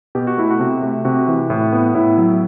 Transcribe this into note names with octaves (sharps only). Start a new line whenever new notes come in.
B2 G4
F#4
A3 E4
F#4
C3
A3
C3 F#4
E3
A2
B3
A2 E4
F#3